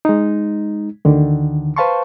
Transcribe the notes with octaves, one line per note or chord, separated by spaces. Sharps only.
G#3 D#4
D2 D3 D#3
B4 C5 F5 A5 C6 C#6